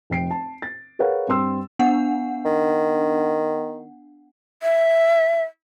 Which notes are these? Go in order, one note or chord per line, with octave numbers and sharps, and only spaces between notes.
F1 G5 C7 D7
A5
A6
G#4 A#4 B4 C#5 F5 F#5
G2 C4 C6 E6
B3 D4 F#5
D#3
E5